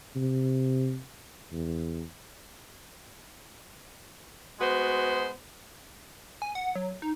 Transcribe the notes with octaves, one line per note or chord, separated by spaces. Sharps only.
C3
E2
G#3 B3 F#4 C5
G#5
F#5
F#3
D#4